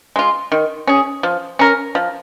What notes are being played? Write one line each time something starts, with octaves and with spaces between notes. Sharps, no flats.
G#3 F4
D#3
C#4 G#4
F3
C#4 A#4
F3